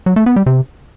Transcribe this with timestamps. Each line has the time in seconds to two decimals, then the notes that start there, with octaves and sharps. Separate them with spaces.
0.06 F#3
0.16 A3
0.26 B3
0.36 G3
0.46 C3